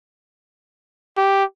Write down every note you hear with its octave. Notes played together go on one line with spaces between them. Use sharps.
G4